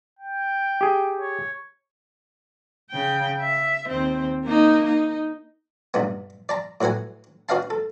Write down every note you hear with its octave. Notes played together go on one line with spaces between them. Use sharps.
G5
G4 G#4
C#5
C#3 G5
E5
D#2 C4
A#3 D#4
D#4
B1 G2 B3
D5 A5 A#5
A2 F#3 B4 F#5 G#5
C#4 F#4 B4 D#5 F5 A5
A4